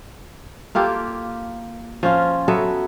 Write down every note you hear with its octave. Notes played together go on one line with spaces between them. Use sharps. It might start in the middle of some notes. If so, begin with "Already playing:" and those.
A#3 F4 G4 A4
F3 C#4 F4
F#3 B3 A4 E5